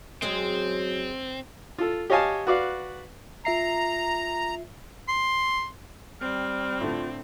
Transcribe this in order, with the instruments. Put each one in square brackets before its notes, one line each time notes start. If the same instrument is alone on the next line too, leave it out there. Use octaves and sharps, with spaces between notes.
[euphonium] F#3 [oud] G#3 C#4 G#4 [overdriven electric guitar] C4
[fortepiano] F4 A4
G4 C#5 D#5 F5 G#5 A5
F#4 B4 D5 F5
[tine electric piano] F4 E5 C7 [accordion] A#5
[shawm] C6
[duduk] G3 [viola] C4 [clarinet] F6
[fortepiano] A2 D3 [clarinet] F4